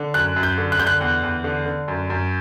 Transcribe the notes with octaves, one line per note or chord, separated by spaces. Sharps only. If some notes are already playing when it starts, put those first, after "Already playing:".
Already playing: D3
F#2 F#6
F#2
G6
D3
F#6
D3 G6
F#6
E2
E2
D3
D3
F#2
F#2